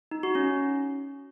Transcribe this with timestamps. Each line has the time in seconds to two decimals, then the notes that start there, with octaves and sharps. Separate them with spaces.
0.11 D#4
0.23 F#4
0.35 C#4